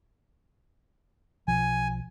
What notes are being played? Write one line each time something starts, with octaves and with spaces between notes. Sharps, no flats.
B1 F3 G#5